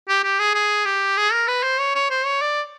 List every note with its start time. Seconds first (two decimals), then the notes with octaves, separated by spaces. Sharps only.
0.09 G4
0.24 G4
0.39 G#4
0.54 G#4
0.85 G4
1.17 G#4
1.33 A#4
1.48 B4
1.63 C5
1.79 C#5
1.95 C#5
2.11 C5
2.25 C#5
2.41 D5